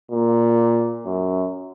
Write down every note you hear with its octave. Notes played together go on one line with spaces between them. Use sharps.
A#2
F#2